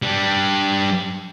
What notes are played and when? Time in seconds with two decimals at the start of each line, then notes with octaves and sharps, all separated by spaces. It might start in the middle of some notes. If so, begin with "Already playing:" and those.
0.02 G3 D4